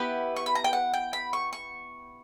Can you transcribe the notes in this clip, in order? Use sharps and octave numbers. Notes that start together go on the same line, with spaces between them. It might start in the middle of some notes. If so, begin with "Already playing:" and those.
Already playing: B3 E4 G4 B4
C#6
B5
A#5
G5
F#5
G5
B5
C#6
C#6